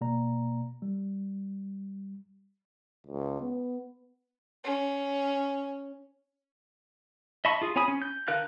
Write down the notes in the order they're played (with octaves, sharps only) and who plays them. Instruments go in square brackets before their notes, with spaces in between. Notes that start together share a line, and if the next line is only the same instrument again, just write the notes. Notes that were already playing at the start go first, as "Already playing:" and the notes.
[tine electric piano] B2 A#3 D5 A#5
G3
[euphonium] C#2
B3
[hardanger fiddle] C#4
[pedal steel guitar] D#5 E5 A5 B5 C#6
F4 G#4
C4 C#5 G#5 B5 D#6
C#4
G6
D3 A#4 F5 F#6 G6